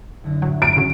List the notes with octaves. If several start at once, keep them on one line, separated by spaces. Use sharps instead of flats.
F#1 D3 A#6
A2 F#3
G2 D7
A2 C#3 E3 F#3 F6 B6